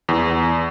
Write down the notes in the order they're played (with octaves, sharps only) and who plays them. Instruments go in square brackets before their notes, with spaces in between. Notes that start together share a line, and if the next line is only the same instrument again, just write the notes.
[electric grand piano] E2